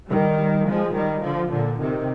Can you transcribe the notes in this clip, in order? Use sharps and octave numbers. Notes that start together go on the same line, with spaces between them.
D#3 G3
F3 G#3
D#3 G3
D3 F3
A#2 D3
C3 D#3